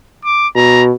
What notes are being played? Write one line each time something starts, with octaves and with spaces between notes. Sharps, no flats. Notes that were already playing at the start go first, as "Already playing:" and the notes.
D6
B2 A#5